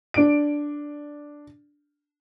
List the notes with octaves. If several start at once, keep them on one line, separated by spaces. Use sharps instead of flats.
D4 D7